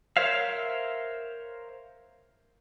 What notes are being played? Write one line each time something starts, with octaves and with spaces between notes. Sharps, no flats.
A#4 C5 C#5 E5 F5